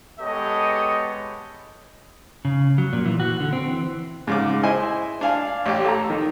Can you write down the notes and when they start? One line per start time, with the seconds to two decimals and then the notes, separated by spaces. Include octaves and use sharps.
0.20 G#3 B3 G4 A4 C#5 D#5
2.45 C#3
2.78 F#3
2.93 A#2
3.06 E3
3.20 F#4
3.40 D3
3.53 C4
3.68 E3
4.27 G#2 C#3 D6
4.63 E4 C5 D#5 G#5
5.21 D4 F5 G#5
5.66 A1 G4
5.85 A4 A#5
6.10 D#3